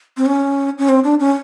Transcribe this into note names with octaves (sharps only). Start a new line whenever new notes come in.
C4
C#4
C#4
C4
D4
C#4